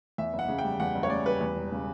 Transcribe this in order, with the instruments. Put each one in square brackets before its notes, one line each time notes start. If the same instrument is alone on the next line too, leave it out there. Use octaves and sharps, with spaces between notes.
[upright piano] E2 E5
F#1
F#5
C#3
G5
G3
E2 F#5
F#1
C#5
C#3 D5
G3 B4
E2
E1
C#3